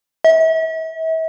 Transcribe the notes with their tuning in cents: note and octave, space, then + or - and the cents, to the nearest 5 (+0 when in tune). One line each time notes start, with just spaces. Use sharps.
E5 -40